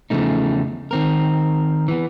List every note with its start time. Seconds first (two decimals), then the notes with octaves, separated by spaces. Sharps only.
0.10 E2 C#3 F3 A3 D#4
0.91 D#3 C4 A#4
1.88 E3 B3